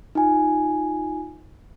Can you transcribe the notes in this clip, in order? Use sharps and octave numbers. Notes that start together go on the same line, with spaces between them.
D#4 F4 G#5